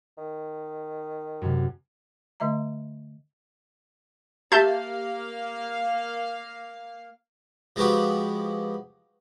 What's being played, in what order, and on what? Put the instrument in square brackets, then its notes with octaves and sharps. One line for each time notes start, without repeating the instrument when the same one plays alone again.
[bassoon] D#3
[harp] F#2 C3
[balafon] D3 A3 D#5 E5 A#5
[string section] A#3 F5 [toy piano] G4 [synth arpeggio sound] E5 A5 G6
[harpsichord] F3 G#3 B3 F#4 G4